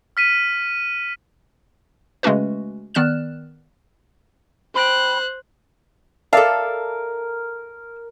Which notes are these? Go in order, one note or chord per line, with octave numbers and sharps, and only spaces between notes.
F6 B6 D#7
C#3 G#3 A3 C#4 F#4 B4
D#3 B3 D5 F6 F#6 E7
C5 G5 G#5 B5 F#6
A4 A#4 D5 E5 F5 A5